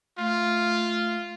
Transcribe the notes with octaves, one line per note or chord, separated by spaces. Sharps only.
A3 F4